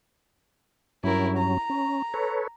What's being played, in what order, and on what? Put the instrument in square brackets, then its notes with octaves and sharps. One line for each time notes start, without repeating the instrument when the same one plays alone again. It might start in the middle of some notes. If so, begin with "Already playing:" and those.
[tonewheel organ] G2 F#3 C#4 [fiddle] E4 A#4
[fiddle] A#5
[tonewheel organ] C#4
A4 B4 C#5